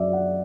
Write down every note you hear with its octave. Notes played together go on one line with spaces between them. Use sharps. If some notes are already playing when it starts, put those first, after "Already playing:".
Already playing: F#2 F#3 D5 E5
F#5